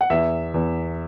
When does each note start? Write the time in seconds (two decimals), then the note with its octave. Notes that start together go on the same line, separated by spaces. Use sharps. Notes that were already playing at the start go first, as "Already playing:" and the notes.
0.01 F#5
0.10 E2 E5
0.54 E2